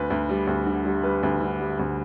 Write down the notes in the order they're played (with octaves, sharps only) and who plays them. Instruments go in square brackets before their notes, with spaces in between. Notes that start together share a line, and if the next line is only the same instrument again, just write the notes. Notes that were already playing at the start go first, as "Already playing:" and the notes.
Already playing: [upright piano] D2 B4
D2
G3
D2
D3
G3
G3 B4
D2
D3
G3
D2